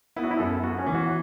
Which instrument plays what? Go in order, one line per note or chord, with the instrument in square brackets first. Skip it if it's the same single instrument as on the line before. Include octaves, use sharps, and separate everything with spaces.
[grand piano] B3 [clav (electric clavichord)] E4
[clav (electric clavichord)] F#4
E4
[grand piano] F#2 [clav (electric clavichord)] A4
[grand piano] B3 [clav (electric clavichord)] F#4
[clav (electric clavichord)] C#4
[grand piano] E3
[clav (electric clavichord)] F#4